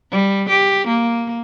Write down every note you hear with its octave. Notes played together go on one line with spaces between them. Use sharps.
G3
G4
A#3